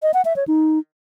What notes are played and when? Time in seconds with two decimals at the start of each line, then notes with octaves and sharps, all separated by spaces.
0.03 D#5
0.14 F#5
0.25 E5
0.36 C#5
0.48 D#4